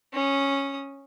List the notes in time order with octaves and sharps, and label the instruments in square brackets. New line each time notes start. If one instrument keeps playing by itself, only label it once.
[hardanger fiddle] C#4 D#6